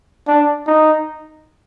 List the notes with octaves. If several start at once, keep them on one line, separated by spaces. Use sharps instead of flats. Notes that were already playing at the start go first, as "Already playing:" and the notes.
D4
D#4